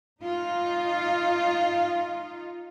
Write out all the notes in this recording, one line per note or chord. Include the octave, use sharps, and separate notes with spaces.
D#4 F4